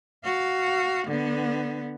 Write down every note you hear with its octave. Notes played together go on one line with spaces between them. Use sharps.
F#4 F5
D3 B3